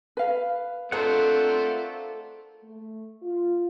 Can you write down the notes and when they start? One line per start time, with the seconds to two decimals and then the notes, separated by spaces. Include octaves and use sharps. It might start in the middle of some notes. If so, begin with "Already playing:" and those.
0.17 B4 F5
0.92 A3 C4 D4 F4 A4 A#4 F#5
2.64 A3
3.23 F4